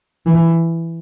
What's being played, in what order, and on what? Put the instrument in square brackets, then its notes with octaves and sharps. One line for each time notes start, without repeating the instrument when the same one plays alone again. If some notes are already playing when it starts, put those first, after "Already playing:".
[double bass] E3